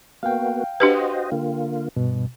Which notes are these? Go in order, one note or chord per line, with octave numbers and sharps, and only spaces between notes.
A#3 B3 F#4 F5 G5
D4 F#4 G4 B4 C5 D#5
D3 A#3 F4
G2 B2